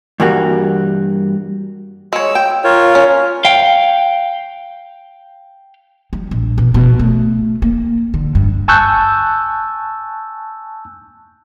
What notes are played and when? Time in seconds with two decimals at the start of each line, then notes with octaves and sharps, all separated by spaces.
0.20 G2 E3 G3 A#3 F#4
2.13 G#3 C#5 E6
2.35 G5
2.64 F4 A#4 C#5
2.95 C#4
3.45 F5 G5
6.13 G3
6.31 A#1
6.58 B2
6.74 B2
6.99 A3
7.62 A#3
8.14 D3
8.35 G2
8.68 G#5 A5 C#6 E6 F#6 G6